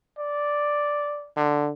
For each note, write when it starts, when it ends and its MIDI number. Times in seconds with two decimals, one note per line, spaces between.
0.18 1.29 74
1.36 1.71 50